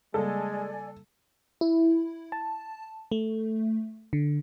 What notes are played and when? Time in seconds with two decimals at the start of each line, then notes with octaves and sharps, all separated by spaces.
0.14 C#3 G3 G#3 A#3 A4 D5 G#5
1.61 E4
2.32 A5
3.12 A3
4.13 D3